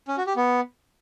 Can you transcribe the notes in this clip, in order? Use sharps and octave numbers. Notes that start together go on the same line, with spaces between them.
C#4
F#4
G4
B3